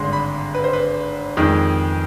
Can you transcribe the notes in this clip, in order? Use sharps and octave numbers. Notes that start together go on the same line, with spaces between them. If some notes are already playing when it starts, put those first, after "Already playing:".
Already playing: G#1 G2 D3 G#3 C6
B5
B4
C5
B4
F2 D#3 G#3